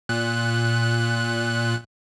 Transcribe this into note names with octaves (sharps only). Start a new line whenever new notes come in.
A#2 F#6